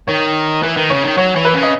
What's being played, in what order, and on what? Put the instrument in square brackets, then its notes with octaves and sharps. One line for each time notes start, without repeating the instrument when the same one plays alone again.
[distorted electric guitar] D#3 [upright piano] C#5
[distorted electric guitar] E3 [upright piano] B4
[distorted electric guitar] D#3
[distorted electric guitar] C#3 [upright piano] C#5
[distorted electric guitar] D#3
[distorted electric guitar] F#3 [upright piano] C#5
[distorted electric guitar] E3 [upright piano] C#5
[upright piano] B4
[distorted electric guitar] C#3
[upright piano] D#5